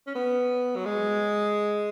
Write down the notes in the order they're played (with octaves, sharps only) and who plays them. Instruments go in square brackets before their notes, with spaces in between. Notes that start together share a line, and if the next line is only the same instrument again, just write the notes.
[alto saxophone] C#4
B3
F#3
G#3